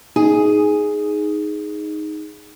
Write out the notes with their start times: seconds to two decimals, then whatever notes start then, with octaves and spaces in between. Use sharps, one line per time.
0.16 D#4 G#4